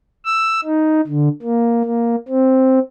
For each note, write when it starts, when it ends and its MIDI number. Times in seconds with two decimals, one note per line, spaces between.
0.25 0.60 88
0.64 1.01 63
1.07 1.29 50
1.43 1.83 58
1.85 2.16 58
2.28 2.79 60